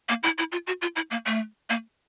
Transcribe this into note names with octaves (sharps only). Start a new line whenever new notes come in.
A#3
E4
E4
F4
F#4
F4
E4
A#3
A3
A#3